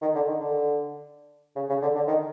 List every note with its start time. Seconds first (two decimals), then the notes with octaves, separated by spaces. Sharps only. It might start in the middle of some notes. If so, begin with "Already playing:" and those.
0.02 D#3
0.15 D3
0.28 D#3
0.41 D3
1.56 C#3
1.70 C#3
1.82 D3
1.95 D3
2.08 D#3